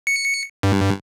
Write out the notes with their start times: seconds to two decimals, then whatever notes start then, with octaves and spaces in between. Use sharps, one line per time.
0.07 C#7
0.63 G2